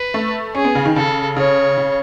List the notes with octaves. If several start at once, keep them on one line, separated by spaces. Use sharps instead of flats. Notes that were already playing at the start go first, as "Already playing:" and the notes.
Already playing: B4
A3
C#4 G#4
B3
C#3
D#3
C#3 A4
C#3 C#5
C#3